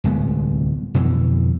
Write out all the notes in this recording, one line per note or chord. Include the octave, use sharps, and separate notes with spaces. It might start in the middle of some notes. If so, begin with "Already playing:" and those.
D1 C2 G#3 B3
F2 B2 D3 E3